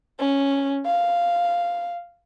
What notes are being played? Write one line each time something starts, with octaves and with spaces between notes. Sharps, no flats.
C#4
F5